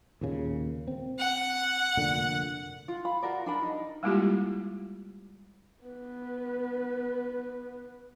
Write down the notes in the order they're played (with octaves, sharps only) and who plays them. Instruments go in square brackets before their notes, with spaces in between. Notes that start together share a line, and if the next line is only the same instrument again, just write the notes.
[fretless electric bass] D#2 A#2 C#3
C4
[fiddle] F#5
[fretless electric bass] F1 A#2 D3
[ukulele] F4
F5 B5
F4 F#4 A#4 D5
D4 A#4 B5
D#4
[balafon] G3 G#3 A#3 E4 F4 G4
[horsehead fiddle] B3 B4